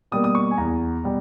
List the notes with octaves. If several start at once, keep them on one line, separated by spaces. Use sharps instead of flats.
B2 G3 A#3 D#6
D#6
C#6
G#5
E2 A#5
B2 G3